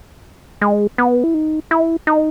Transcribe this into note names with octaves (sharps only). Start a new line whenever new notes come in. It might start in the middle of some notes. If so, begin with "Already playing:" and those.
G#3
B3
E4
D#4
E4
D#4